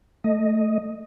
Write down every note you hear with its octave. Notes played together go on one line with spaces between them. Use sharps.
A3 D#5